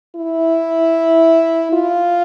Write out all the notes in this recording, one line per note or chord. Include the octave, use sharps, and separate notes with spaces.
E4
F4